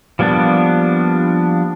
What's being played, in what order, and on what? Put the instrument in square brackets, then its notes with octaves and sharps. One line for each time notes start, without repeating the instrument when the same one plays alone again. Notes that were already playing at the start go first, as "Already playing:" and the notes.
[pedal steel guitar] F3 G3 A#3 B3 D4